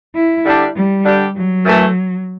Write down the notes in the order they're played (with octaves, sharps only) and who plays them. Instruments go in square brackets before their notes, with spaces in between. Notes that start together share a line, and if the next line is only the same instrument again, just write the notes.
[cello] E4
[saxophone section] D3 G3 D4 G4
[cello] G3
[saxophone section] D3 G3 D4 G4
[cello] F#3
[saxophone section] F#2 E3 A3